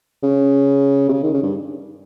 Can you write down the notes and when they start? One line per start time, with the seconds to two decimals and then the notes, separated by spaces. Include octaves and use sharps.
0.23 C#3
1.09 C3
1.13 C#3
1.23 D#3
1.34 C#3
1.43 G2